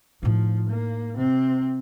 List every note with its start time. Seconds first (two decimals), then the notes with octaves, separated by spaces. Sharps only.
0.23 A2 F3 D#4
0.69 A#3
1.15 C3 C4